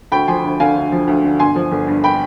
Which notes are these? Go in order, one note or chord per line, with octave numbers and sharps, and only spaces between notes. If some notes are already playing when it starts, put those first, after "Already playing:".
D2 G5 B5
F3 G#5 C6
D2
D3 F5 G#5
D2
F3
D2
D3
G1 G#5 C6
F3
G1
G2
G5 B5